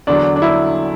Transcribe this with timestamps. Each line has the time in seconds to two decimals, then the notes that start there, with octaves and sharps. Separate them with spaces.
0.07 E2 D3 F#3 D4
0.36 D4
0.42 D3 F#3 E4